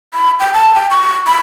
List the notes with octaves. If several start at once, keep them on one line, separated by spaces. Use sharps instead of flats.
B5
G5
A5
G5
C#6
B5